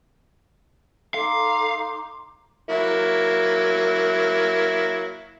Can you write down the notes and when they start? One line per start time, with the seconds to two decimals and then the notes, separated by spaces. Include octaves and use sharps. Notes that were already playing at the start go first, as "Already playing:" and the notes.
1.14 D#4 A4 F5 C6 D6
2.69 F#3 A#3 E4